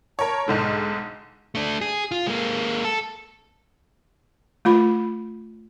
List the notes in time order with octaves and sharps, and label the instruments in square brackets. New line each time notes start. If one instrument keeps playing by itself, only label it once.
[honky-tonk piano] A#4 C#5 [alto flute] A5
[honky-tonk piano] B1 G#2 D3 [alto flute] G#3
[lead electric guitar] A3 D4
G#4
F4
G#3 A#3
A4
[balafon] A3 F4 B5